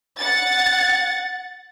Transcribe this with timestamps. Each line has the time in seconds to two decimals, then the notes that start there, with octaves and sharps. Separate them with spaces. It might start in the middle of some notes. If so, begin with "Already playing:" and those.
0.18 F#5 A6